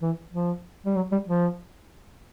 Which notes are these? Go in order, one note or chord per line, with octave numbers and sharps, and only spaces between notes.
E3
F3
G3
F#3
G3
F3